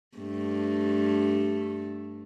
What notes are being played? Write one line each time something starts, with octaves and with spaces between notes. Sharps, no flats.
G2 A3